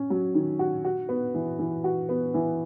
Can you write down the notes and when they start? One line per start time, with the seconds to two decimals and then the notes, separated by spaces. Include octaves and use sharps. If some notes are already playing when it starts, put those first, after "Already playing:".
Already playing: C#4
0.10 F#3
0.35 D#3
0.59 F#4
0.84 F#4
1.09 B3
1.34 E3
1.59 E3
1.84 F#4
2.09 B3
2.34 E3